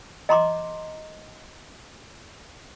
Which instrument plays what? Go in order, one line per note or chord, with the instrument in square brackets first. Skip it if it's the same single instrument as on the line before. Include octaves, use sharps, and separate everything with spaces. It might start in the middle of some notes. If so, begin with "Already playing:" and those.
[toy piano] D#5 A#5 C6 D6